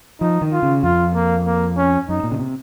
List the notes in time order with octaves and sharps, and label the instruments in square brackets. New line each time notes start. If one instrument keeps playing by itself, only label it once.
[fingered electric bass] F3 [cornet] D#4
[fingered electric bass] D#3
[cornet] F4
[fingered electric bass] C#3
[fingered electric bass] F2 [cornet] F4
[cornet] A#3
A#3
C#4
[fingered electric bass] F#2 [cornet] D#4
[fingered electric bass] A#2
C#3
C3